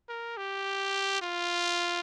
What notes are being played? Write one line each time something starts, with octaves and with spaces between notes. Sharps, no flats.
A#4
G4
F4